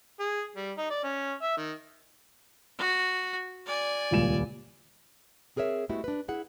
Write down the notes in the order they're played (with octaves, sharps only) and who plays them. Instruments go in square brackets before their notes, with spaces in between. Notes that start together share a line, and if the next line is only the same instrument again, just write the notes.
[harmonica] G#4
G3
D#4
D5
C#4
E5
D#3
[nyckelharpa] F#4
D5 G#5
[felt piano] D#1 C#2 E7
[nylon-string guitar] C4 G#4 A#4 C#5 E5
G#3 A3 B3 E4 F#4 G4
D4 B4
E4 G#4 F#5